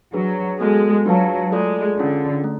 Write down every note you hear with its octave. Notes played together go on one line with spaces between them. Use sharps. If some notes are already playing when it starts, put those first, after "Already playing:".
F#3 D4 G#4 B4
G#3 B3 F#4 A4
F#3 D4 F4 B4 F5 A5
G#3 A3 F4 A4 D5
D3 C#4 F4 G#4
A3